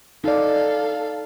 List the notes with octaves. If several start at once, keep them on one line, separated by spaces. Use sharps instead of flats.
D#4 A4 D5 F5